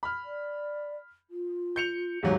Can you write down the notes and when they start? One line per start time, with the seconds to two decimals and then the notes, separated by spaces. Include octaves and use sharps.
0.03 B5 F6
0.25 D5
1.30 F4
1.76 G6 C#7 F7
2.23 D#1 G#2 F#3 F5